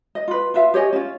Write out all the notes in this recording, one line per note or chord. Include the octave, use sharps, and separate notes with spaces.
D#5
F4 B4
F4 B4 E5 F5
G4 C#5 D#5 G#5
C#4 F4